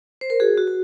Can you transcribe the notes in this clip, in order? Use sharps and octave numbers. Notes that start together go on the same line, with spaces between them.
C5
A#4
F#4 G#4
F#4
F#4